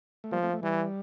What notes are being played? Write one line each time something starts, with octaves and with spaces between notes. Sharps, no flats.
A3
F3 G3 A#3
A3 C4
A3
E3 G3